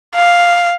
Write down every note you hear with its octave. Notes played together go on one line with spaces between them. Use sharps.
F5